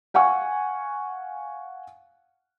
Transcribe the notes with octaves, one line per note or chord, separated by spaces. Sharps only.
F5 F#5 G#5 C#6